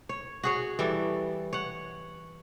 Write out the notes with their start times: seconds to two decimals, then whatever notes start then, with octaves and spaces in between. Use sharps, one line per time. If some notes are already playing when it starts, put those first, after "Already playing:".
0.09 C#5
0.43 F#4 G#4 C#5
0.79 E3 G3 A4
1.53 C#5 F#5